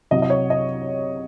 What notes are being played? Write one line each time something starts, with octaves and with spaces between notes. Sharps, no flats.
C2 C3 F#3 D#5
D#5
C#5
D#5